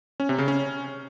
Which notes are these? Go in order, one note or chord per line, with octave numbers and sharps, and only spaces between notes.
C#4
C3
C#3
C#4